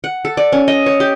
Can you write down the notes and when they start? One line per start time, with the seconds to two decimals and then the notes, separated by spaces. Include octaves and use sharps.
0.04 F#5
0.25 A4
0.37 D5
0.52 C#4
0.68 D#5
0.86 C#5
1.00 G4